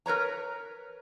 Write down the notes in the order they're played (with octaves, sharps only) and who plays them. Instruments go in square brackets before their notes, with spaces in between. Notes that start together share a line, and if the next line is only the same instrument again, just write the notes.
[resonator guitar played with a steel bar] A#4 B4 C#5 A#5